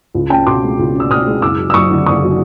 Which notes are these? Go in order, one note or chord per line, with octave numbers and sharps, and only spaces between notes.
C#2
C#4 G5 A5
B2 C6 D6
G#3
C#2
C#4
E6
B2 D#6 F6
G#3
F#1 D6 E6
F#3
E6
F#2 C#6 D#6
D3
F#1 C#6 D#6
F#3